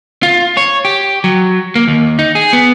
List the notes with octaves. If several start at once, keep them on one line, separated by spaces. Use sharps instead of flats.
F4
C#5
G4
F#3
A#3
D#2
D#4
G#4
B3